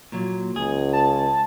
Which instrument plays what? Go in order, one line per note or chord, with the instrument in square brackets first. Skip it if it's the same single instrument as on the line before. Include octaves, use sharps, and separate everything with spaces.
[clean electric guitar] A#2 F#3
[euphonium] C#2 [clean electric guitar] G#4
[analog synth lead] A5